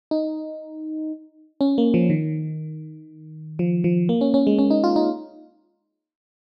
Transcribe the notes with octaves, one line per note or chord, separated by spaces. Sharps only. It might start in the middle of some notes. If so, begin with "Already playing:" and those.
D#4
C#4
A#3
F3
D#3
F3
F3
A#3
C#4
C#4
G#3
C#4
D#4
F4
D#4